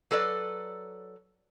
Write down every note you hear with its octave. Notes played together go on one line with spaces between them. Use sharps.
F#3 A4 B4 D5